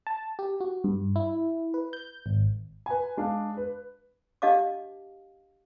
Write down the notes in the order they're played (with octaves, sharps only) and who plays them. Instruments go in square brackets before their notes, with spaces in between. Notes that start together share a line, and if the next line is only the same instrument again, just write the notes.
[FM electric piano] A5
G4
F#4
G2
E4
B4
G6
G#1
[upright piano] B4 G#5
G#3 D4 F5
B4
[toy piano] D4 G4 D#5 F5 A5 D6